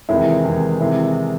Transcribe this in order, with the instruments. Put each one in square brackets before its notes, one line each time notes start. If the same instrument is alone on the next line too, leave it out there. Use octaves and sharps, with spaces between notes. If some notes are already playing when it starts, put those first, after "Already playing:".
[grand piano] E2 C3 D#3 G#3 [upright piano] E4
[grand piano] E2 C3 D#3 G#3
[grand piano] C3 D#3 G#3 [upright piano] E4